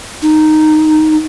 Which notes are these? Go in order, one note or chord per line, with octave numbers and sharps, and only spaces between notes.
D#4